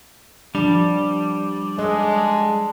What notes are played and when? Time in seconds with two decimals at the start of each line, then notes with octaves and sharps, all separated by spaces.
0.55 F3 G3 D4 D5 A5 G6
1.78 G#3 D4 A4 C#5 D#5